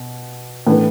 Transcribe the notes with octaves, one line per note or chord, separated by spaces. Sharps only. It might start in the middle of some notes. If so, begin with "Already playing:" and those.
Already playing: B2
A2 E3 B3 D4